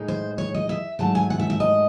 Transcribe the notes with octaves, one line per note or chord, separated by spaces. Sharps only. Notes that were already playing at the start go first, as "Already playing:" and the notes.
Already playing: A2 G#3 D#4
C5
C#5
D#5
E5
G#2 F#3 A3 A5
G#5
F#5
E5
E5
D#5